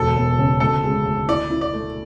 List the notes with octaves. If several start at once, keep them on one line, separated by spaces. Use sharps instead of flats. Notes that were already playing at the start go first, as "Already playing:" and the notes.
Already playing: E1 D2 A4
E1
C#3
D2 A4
G#3
D2
E4 D5
E4
D5
A3